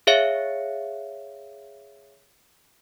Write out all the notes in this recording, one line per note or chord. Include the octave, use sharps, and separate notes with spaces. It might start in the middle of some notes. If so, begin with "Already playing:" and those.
G#4 C#5 E5 F5 C#7